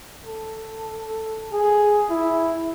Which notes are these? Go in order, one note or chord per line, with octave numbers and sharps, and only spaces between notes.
A4
G#4
E4